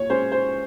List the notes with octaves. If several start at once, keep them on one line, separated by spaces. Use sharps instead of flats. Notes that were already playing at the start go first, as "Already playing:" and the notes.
Already playing: A#2 C#5
G#3 C#4 C5
C5